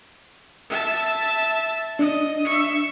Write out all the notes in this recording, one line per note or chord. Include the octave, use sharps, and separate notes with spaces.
E5 A5
D4 D#5
E5 C#6